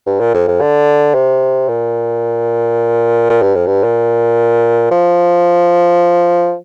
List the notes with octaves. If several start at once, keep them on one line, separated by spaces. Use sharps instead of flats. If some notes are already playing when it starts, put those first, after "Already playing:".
G2
A#2
F2
F2
D3
C3
A#2
A#2
G2
F2
G2
A#2
F3